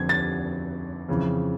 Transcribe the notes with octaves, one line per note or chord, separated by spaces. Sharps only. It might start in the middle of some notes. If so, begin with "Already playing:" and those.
Already playing: F2 D3 G#6
A6
F2 C#3 E3